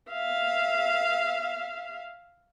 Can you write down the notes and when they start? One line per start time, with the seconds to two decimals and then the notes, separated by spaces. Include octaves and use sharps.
0.11 E5 F5